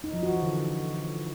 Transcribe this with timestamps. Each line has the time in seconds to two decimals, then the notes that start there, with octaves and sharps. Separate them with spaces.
0.04 D#4
0.13 F3
0.23 F#4
0.32 E3
0.42 D3